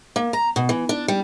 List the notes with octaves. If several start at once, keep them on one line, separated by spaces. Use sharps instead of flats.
A#3
A#5
B2
E3
D4
G3